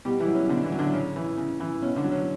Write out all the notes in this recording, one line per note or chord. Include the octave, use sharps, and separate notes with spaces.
B2 G3 G4
E3 E4
F#3
C#4
B2 D3 D4
E3 E4
F#3
D3 D4
C#3 C#4
E3
C#3
E3
B2 C#4
D3 D4
F#3
C#4